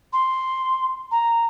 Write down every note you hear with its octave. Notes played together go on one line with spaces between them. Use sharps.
C6
A#5